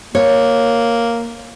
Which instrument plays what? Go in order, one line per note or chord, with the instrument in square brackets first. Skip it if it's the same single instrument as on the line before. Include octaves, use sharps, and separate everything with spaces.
[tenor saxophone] A#3 [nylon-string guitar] C#5